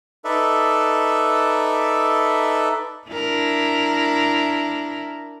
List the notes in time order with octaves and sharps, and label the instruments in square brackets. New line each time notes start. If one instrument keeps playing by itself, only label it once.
[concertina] D#4 A4 B4 D5 E5
[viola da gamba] D4 E4 A#4